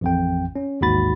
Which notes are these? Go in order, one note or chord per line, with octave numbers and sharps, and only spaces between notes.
A1 F2 G5
C#4
A1 D#2 G#2 F#4 B5 A6